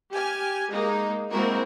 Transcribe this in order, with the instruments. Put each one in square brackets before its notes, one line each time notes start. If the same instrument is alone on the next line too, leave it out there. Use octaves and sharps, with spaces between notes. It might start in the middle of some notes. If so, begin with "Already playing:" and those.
[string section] G4 G#5 F6
G#3 A#3 D#4
G#3 A#3 C4 E4 F#4 A#4